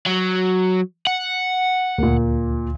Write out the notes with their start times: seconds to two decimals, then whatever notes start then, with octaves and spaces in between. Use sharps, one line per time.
0.06 F#3
1.07 F#5
1.98 D2 A#2 A#3